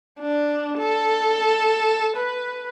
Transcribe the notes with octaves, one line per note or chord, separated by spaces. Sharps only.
D4
A4
B4